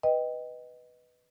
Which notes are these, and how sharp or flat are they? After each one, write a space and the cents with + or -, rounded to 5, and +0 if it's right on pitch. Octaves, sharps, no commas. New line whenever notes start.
B4 +0 D#5 +0 G5 +0